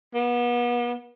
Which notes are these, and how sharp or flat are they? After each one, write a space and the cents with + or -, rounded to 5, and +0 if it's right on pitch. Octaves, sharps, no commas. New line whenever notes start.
B3 -35